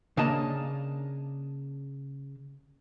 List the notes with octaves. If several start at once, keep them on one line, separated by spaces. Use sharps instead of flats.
C#3 A#3 D4 D#5 A5 A#5